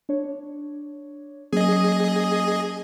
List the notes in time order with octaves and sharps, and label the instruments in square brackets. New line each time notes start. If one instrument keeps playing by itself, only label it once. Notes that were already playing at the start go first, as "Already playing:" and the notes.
[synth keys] D4 C#5
[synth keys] F#3 A#3 C#4 [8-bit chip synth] G#4 D#5